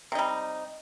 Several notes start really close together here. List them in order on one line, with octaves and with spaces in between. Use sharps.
C3 D#4 G3